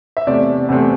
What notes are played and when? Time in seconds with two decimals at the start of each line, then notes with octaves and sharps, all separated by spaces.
0.17 E5
0.27 E2 C3 A3 C4 D5
0.69 E2 C3 A3 C4